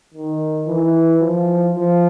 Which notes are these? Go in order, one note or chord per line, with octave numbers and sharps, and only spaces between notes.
D#3
E3
F3
F3